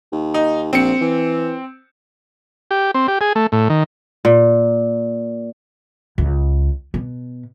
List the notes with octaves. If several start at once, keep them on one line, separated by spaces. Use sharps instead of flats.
D#2
D#4
A#1 C4 C#7
E3
G4
C4
G4
G#4
A3
A2
D#3
A#2
C#2
B2